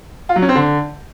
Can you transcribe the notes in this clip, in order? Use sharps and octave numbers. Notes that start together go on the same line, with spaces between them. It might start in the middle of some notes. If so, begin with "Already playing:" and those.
F4
F#3
C#4
C4
D3